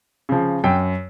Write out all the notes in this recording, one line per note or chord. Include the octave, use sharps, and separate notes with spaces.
C#3 F3
F#2 G5